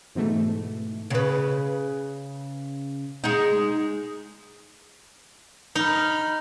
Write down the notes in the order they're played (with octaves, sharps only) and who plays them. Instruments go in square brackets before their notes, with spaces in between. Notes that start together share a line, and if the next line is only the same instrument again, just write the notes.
[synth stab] G#2 B2 E3 A3
[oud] C#3 B4
G#3 D#4
[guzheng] D#4 [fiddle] B5 F6